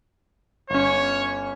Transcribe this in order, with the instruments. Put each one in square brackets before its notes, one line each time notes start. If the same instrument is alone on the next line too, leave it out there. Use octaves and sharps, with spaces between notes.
[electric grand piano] G1 C#4 [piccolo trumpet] C#5